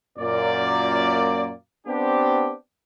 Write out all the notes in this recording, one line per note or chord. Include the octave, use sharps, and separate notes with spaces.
F#2 A#2 A#3 D5
B3 C4 D4 G4